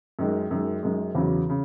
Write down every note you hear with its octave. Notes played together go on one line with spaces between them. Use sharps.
F#2 D#3 G#3
F#2 D#3 G#3
F#2 D#3 G#3
E2 C#3 F#3
C#3